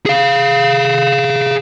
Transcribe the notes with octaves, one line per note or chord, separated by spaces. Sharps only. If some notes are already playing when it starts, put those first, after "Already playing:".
G#4 F5